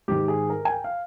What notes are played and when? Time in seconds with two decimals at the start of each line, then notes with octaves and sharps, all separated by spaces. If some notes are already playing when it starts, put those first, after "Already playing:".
0.08 G#2 D#3 G4
0.28 G#4
0.50 A#4
0.65 G#5
0.70 G5
0.84 F5